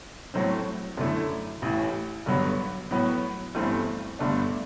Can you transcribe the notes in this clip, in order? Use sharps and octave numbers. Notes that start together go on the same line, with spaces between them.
A2 F#3 A3 C4
F#2 D3 A3 E4
A1 A2 E3
G2 D3 F#3 B3
A2 F#3 B3
G1 G2 E3 A3 C4
G1 G2 D3 A3 D4